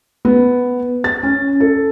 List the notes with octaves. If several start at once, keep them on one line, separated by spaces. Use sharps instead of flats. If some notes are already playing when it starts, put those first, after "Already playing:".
B3
A6
C#4
A4